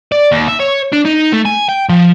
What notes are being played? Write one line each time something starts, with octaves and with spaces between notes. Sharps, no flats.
D5
D#2
E5
C#5
D4
D#4
A3
G#5
G5
F3